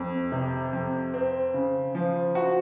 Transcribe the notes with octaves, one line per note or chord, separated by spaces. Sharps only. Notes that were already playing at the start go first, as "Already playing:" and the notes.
Already playing: F2
C3
F2
C4
C#3
F3
F#4